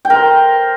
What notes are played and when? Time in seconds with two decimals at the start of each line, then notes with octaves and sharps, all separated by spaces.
0.05 G5
0.10 A#4
0.15 C5